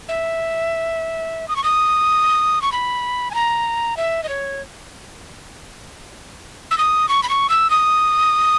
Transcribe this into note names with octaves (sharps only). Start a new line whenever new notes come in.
E5
D#6
C#6
D#6
C#6
B5
G#5
A#5
E5
D#5
C#5
E6
D#6
C#6
B5
C#6
E6
D#6